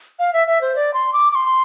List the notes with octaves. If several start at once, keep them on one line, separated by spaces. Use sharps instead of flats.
F5
E5
E5
C5
D5
C6
D6
D6
C6